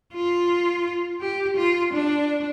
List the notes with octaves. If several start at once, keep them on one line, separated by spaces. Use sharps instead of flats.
F4
G4
F4
D4